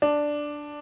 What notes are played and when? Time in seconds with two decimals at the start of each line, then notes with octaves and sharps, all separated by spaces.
0.02 D4